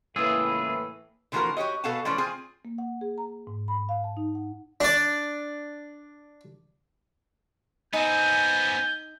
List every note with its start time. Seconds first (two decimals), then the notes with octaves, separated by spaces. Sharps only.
0.16 C#2 A2 E3 A#3 F4 G#4 E6
1.32 D3 E3 F3 A#3 F#4 A#4
1.57 F#4 G4 C#5 D#5
1.84 B2 A4 F5 F#5 G#5 A5
2.05 E3 F3 A3 C#4 D5
2.18 C4 F4 G#4 G#5
2.65 A#3
2.78 F#5
3.01 G#4
3.18 A#5
3.47 G#2
3.68 B5
3.89 F5
4.04 A5
4.17 D#4
4.35 F#5
4.81 D4 D5
7.93 B3 C4 D#4 G#5 G6